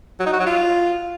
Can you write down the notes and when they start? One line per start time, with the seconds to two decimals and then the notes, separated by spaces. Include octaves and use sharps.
0.20 F#3
0.26 D#4
0.33 F#4
0.40 F#3
0.47 F4